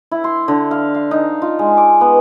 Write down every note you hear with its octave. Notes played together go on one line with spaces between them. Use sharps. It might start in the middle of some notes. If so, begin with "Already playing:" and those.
E4
C6
D3
F5
F5
D#4
F4
G#3
D6
B3